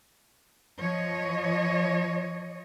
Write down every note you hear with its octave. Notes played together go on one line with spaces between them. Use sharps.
F3 C#5 D#5